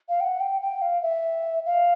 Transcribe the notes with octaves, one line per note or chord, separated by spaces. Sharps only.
F5
G5
F#5
G5
G5
F5
E5
F5